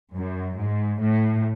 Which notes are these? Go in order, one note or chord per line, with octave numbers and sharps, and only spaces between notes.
F#2
G#2
A2